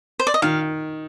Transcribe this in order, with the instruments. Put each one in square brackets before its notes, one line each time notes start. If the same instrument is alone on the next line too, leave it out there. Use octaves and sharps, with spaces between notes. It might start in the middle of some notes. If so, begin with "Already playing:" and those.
[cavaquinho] C5
D5
D#5
[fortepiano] D#3 [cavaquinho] F5